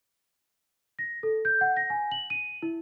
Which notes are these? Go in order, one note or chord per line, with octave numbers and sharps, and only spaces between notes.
A#6
A4
G6
F#5
A#6
G#5
F#7
D#7
E4